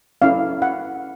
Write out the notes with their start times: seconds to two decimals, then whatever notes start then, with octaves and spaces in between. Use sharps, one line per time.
0.22 C#4 E4 A4 F5
0.62 F#5